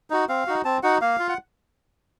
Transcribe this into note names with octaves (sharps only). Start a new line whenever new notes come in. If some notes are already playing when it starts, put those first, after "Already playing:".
D#4 F#4
C4 F5
D#4 F#4
C4 A5
D#4 F#4 F#5
A#3 F5
F4
F#5